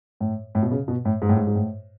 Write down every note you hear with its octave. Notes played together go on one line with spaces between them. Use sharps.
A2
A2
B2
C#3
B2
A2
G#2
A2
G#2
G#2
A2